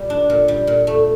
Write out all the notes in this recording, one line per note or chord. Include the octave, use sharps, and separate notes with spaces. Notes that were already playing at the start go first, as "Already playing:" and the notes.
Already playing: A#2 G3
D4
A#2
G3
A#2
A3